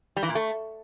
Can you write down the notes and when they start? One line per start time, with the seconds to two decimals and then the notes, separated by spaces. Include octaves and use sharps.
0.16 G3
0.23 E3
0.29 A#2
0.35 A3